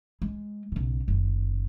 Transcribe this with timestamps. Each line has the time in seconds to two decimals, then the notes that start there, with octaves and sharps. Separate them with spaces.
0.22 G#3
0.72 B1 C#3
1.08 F#1 D#3